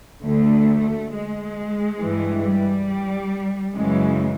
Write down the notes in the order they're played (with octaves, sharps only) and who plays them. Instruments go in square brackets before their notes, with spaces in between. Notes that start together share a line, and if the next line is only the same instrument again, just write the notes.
[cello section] D2 D3 A3
G#3
G2 E3
G3
F#2 C#3 E3 G#3